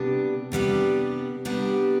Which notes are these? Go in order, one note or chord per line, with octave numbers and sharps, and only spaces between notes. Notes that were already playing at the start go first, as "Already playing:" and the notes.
Already playing: C3 G3 B3 D4 G4
C3 G3 B3 D4 G4
C3 G3 B3 D4 G4